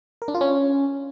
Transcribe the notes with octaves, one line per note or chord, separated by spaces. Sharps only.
A#4
D4
F4
C#4